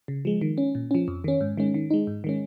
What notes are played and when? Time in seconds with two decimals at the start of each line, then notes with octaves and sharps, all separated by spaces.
0.08 C#3
0.25 F3 G#3
0.41 D#3
0.58 C#4
0.75 A#2
0.91 F3 C#4
1.08 F2
1.24 D#3 C#4
1.41 G#2
1.57 D#3 G#3 C#4
1.74 D#3
1.90 G#3 D#4
2.07 G#2
2.24 D#3 G#3 C#4